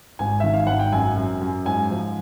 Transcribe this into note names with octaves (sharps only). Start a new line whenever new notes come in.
G#1 G#5
D#3 E5
F5
G#1 F#5
G5
F#2 G#5
F#2
F#2
G#2 G#5
F3